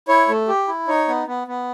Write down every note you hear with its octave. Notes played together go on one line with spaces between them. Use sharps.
E4 C#5
A3
G4
E4
D#4 C#5
B3
B3
B3